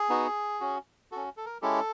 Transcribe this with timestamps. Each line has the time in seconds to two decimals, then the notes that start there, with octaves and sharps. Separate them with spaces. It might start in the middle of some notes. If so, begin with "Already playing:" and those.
Already playing: G#4
0.09 B3 D#4 F#4
0.60 C#4 F#4
1.12 C#4 F#4 A4
1.37 A4
1.46 A#4
1.62 G#3 C#4 E4 G4 A4